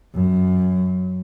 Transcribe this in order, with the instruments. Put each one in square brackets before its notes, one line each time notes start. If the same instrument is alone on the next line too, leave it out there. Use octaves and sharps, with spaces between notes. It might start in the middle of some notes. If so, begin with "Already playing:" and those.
[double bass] F#2